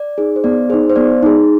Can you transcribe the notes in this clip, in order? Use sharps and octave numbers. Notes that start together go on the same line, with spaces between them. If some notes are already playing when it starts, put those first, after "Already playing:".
Already playing: D5
D#4 G#4
C5
B3 D5
D#4 G#4 C5
C5
B3 D5
D#4 G#4